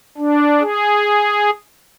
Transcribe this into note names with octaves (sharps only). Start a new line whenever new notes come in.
D4
G#4